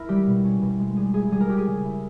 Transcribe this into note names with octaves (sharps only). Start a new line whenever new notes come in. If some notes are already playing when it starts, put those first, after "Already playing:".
Already playing: E4 A#4
G3 G4
B2
C#4
B2
G#3
G3 G#4
E4 G#4
G3 G#4
A#4
C#4 G4
G#4
C#3
E4